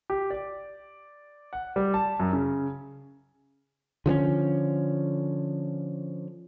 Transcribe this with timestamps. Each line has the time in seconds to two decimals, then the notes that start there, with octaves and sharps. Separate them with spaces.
0.10 G4
0.30 D5
1.53 F#5
1.76 G3
1.94 A5
2.20 F#2
2.33 C#3
4.06 D3 F3 B3 C#4